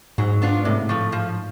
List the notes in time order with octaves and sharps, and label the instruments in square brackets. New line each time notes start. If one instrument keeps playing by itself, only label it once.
[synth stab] G#2 [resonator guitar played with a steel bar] F#3
[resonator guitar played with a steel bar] B3 D4 F4
[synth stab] A2 [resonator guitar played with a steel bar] C3
[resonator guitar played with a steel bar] F3 A3
F3